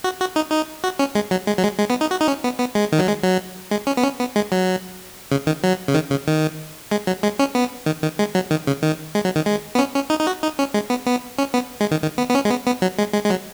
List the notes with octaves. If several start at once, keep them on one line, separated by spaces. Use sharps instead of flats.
F#4
F#4
D#4
D#4
F#4
C#4
G#3
F#3
G#3
F#3
G#3
G#3
B3
D#4
F#4
D#4
C#4
B3
B3
G#3
D#3
F#3
G#3
F#3
G#3
C#4
B3
C#4
B3
G#3
F#3
C#3
D#3
F#3
C#3
D#3
C#3
D#3
G#3
F#3
G#3
C#4
B3
D#3
D#3
G#3
F#3
D#3
C#3
D#3
G#3
F#3
D#3
G#3
B3
C#4
C#4
D#4
D#4
F#4
D#4
C#4
G#3
B3
B3
C#4
B3
G#3
D#3
D#3
B3
B3
C#4
G#3
B3
B3
F#3
G#3
G#3
G#3
F#3